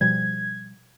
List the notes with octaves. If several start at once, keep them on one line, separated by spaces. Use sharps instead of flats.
B2 F3 G3 G#6